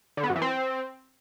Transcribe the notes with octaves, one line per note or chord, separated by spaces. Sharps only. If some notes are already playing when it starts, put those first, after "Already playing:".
D3
B3
F#2
E3
C4